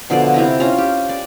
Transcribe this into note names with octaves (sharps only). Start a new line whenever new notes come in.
B2 D3 F3 D5
C3 E4 A#5
C#4 F4 C5 A#5
G4
D5